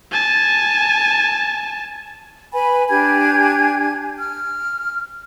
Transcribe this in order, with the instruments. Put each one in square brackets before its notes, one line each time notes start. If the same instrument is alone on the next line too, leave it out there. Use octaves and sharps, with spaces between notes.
[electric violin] G#5 A5
[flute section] B4 G#5 B5
D4 G4 G#5 G#6
F6